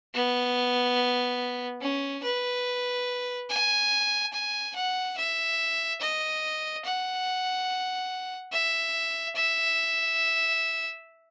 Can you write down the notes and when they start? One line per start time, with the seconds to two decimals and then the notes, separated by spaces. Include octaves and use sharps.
0.14 B3
1.81 C#4
2.23 B4
3.50 G#5
4.33 G#5
4.76 F#5
5.18 E5
6.01 D#5
6.85 F#5
8.52 E5
9.36 E5